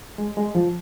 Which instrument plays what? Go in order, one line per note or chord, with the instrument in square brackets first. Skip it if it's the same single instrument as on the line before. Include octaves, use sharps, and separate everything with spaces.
[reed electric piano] G#3
G#3
F3